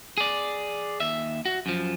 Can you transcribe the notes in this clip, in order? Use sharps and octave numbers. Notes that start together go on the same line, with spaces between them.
G#4 D5
D#2 E5
F#4
F#2 F3